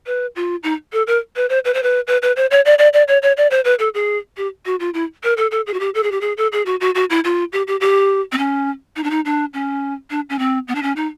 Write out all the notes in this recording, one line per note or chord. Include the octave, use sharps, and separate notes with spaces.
B4
F4
D#4
A4
A#4
B4
C5
B4
C5
B4
B4
B4
C5
C#5
D5
D5
D5
C#5
C#5
D5
C5
B4
A4
G#4
G4
F#4
F4
E4
A#4
A4
A4
G#4
F#4
G4
A4
G#4
G4
G#4
A4
G#4
F#4
F#4
F#4
E4
F4
G4
G4
G4
C4
C#4
D#4
D4
D#4
D4
C#4
D4
C#4
C4
B3
D4
C#4
D#4